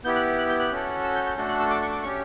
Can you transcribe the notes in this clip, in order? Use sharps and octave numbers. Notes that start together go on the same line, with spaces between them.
B3 E4 G4 G6
F#6
F#6
G6
F#6
C#4 F#4 A4
E6
G6
G6
A3 D4 F#4 A4
F#6
E6
D6
C#6
D6
C#4 G4 C#6